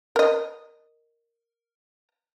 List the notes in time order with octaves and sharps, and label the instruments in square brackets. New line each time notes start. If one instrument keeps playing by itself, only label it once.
[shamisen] A#4 D#5